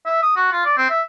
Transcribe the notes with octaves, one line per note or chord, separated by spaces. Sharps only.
E5
D#6
F#4
F4
D5
C4
E5